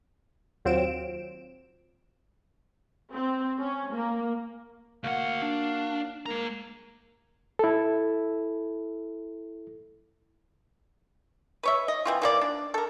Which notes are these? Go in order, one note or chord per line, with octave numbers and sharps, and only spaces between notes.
D#2 F#3 C4 F4 D7 E7
C4
C#4
A#3
D2 A#3 F#4 F5 F#5
D4
G#3 A#3 A#5
E4 A4
B4 C#5 E5
D#5
E3 C4 F4
E3 A#3 D5
D4
A4 A#4